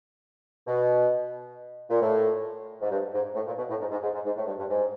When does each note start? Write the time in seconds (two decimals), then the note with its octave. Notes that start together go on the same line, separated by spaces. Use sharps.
0.67 B2
1.90 A#2
2.02 A2
2.82 G#2
2.90 G2
3.13 G#2
3.35 A2
3.47 A#2
3.57 B2
3.70 A2
3.80 G#2
3.91 G#2
4.02 G#2
4.14 G#2
4.26 G#2
4.36 A2
4.47 G2
4.59 G2
4.70 G#2